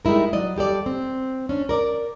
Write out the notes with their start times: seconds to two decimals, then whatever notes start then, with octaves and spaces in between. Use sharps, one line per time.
0.05 G3 G#3 D#4 E4 A#4
0.33 F#3 D5 D#5
0.56 G3 G4 A4 D5
0.86 C4
1.49 C#4 D4
1.69 A#4 D5